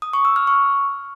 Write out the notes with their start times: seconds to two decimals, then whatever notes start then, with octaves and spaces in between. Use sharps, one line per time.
0.02 D#6
0.13 C#6
0.25 E6
0.36 F6
0.47 C#6